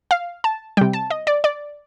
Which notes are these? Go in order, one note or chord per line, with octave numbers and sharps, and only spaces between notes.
F5
A5
C3 G3 G5
A5
D#5
D5
D5